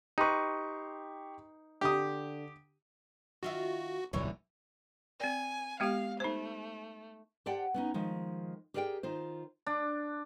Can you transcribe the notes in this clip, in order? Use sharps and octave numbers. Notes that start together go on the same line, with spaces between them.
D#4 G4 B4 C6 C#6
D3 G4 D#6
D#3 F4 F#4 E5
D1 B1 G2 D3 E3 C#5
C4 D5 G#5
G#3 B3 G4 F5
A3 D#4 C5
G4 C5 D5 F#5 G5 A5
B3 C#4 D#4
D#3 F3 G#3
G4 G#4 A#4 D5 F5 G5
D#3 F4 C5
D4